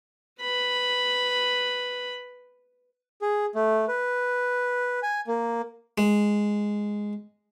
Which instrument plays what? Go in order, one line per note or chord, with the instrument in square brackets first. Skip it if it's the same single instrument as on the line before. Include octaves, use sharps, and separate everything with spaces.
[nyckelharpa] B4 B5
[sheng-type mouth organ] G#4
A3
B4
G#5
A#3
[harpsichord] G#3